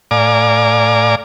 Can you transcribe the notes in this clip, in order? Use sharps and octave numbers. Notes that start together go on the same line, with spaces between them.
A2 D5 F5 G#5 A#5 D6